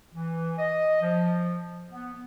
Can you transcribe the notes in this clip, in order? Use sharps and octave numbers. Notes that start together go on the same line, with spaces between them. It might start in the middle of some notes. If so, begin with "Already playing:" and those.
E3
D#5
F3
B3